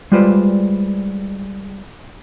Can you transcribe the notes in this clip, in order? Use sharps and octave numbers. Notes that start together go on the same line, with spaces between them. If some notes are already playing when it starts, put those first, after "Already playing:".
G3 G#3 F4 B4 C5 D5